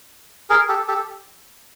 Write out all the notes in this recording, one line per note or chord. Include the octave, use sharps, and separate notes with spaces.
G#4 A#4
G4 A4
G4 A4